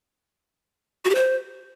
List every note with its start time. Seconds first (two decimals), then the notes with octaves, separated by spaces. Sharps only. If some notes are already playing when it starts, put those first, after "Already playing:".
1.05 F#4
1.10 G4
1.15 C5